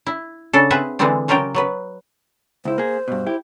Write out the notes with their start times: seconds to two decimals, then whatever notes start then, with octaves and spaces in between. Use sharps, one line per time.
0.06 E4
0.53 C#3 D4 A4
0.70 C4 G#4 B4 E5 F#5
0.99 D3 E3 G#3 B3 C4 D4
1.28 C#3 F#3 F4 G4 A#4 G5
1.55 F#3 B3 B4
2.65 C#2 E4 C5
2.78 A#3 G#4
3.08 G2 B2
3.27 E4 G4